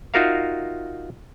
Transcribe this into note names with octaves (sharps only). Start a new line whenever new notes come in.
D#4 F4 F#4 A#4 E5 F5